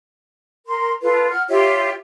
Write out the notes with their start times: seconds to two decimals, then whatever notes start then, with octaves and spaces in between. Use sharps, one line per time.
0.67 A#4 C6
1.02 F4 A4 B4
1.29 F#5 F6
1.49 F4 G4 C#5 E5